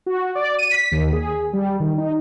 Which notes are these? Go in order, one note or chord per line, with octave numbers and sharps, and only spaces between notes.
F#4
D5
D#7
B6
D#2
G#4
G3
D#3
D#4